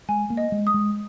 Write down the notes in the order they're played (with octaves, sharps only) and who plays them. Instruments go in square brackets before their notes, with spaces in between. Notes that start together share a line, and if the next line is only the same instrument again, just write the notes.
[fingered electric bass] G#3 [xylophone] G#5
[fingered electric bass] A#3
[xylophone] D#5
[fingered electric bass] G#3
[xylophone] D#6
[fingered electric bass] G#3